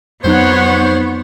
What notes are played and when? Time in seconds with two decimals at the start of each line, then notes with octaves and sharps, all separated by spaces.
0.24 F2 F#3 B3 D#4 C5 C#5 F#5